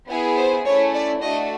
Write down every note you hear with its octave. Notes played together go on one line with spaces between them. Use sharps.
B3 E4 G#4
C5
A3 C#4 E4 C#5
D5
A3 D4 F#4 D#5